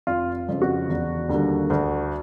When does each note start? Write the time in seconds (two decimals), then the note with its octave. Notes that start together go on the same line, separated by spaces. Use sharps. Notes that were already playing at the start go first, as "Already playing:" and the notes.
0.07 F1 F4
0.49 F2 C#3
0.62 F#4
0.89 E1
1.29 D#2 D3 G3 A#3
1.70 D2